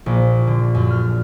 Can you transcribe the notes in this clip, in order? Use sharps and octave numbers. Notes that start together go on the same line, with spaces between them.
A#1
D3
F#2
F6